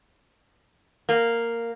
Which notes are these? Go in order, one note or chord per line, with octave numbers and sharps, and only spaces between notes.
A#3